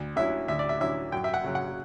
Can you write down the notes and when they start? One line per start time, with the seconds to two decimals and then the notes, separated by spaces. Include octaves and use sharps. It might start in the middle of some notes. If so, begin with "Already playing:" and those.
Already playing: D2
0.16 D3 F#3 C#4 E4 E5
0.48 D2 E5
0.59 D5
0.69 E5
0.80 D3 F#3 C#4 E4 E5
1.12 F#2 G5
1.24 E5
1.34 F#5
1.44 C#3 F#3
1.55 F#5